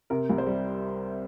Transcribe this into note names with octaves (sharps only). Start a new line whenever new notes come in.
C3 A#4
C2
C5
G3